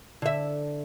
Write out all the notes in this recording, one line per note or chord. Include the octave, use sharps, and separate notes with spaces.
D3 E5